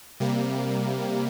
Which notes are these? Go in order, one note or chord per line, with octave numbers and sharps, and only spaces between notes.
C3 G3 A#3